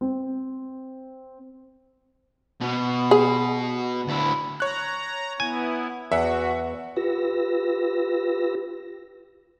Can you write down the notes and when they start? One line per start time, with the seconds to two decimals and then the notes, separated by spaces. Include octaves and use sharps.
0.01 C4
2.60 B2
3.11 G#4
4.08 D2 E4
4.60 C#5 A#5 F#6
5.40 B3 E4 G#5
6.12 E2 F#4 E5 F#5
6.96 F4 G4 B4 E6 A#6